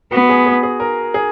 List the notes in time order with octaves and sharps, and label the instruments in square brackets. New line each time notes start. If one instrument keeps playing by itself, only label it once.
[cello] B3 [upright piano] F#4
[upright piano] G#4
G#4
G#4
A#4
G#4